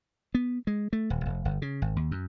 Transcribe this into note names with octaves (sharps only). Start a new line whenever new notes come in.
B3
G#3
A3
D#1
F1
G1
C#3
G#1
D#2
F#2